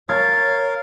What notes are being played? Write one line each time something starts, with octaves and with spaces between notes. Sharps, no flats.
A#4 C#5 F5 G#6 A6